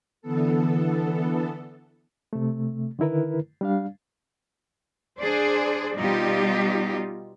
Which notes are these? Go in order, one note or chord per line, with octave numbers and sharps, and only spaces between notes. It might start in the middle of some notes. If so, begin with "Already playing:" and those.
D3 E3 B3 A4
C3 A3
D3 D#3 E4 A#4 B4
G3 D4 F5
D4 G#4 C5 D5
B2 G3 D#4 F4 G4